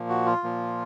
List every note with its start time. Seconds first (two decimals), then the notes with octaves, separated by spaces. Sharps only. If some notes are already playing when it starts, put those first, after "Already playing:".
Already playing: A#2 F3 A#3
0.09 F#4
0.26 F4
0.44 A#2 F3 A#3